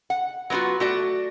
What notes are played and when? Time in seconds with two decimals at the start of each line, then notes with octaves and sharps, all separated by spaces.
0.10 F#5
0.50 F#3 B3 C4 F4 F#4
0.80 A3 F#4 D5